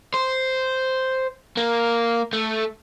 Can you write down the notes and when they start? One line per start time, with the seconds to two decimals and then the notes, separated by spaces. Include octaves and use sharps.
0.14 C5
1.57 A#3
2.33 A3